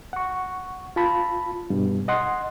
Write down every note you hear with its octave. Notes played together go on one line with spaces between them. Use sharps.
F#5 C#6
F4 A5 B5
G2 B2
D#5 F#5 C6